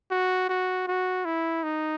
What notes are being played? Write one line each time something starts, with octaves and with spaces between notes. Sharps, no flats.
F#4
F#4
F#4
E4
D#4